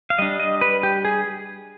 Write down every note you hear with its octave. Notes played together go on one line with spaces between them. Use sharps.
F5
G3 D4 D#5
D#5
B4
G4
G#4